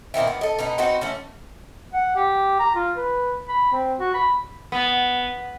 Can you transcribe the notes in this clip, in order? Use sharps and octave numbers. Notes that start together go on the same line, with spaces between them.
A#2 D#3 C4 E4
B3
A4 D#5
B2 B3 D#4
C4 D#4 F#4 B4
E3 A3 C#4
F#5
G4
A#5
F4
B4
B5
C4
F#4
B5
B3